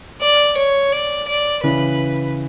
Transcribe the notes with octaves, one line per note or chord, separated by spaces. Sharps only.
D5
C#5
D5
D5
C#3 E3 B4